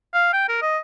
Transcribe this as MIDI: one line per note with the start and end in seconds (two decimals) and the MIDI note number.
0.14 0.29 77
0.33 0.48 79
0.49 0.60 70
0.62 0.78 75